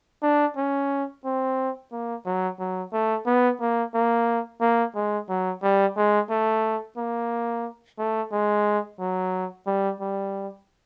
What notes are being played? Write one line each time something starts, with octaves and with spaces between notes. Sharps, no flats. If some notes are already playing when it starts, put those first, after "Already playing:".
D4
C#4
C4
A#3
F#3
F#3
A3
B3
A#3
A#3
A#3
G#3
F#3
G3
G#3
A3
A#3
A3
G#3
F#3
G3
G3